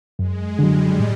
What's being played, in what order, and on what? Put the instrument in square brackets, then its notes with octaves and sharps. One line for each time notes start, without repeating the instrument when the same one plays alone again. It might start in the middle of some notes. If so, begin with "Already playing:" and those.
[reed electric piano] F#2 [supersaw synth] G#3
[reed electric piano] D3 F#3 [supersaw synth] G3
[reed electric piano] A2